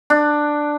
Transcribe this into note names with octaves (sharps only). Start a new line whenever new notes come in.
D4